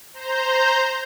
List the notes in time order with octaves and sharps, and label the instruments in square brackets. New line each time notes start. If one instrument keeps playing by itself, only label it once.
[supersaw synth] C5 A#5 G6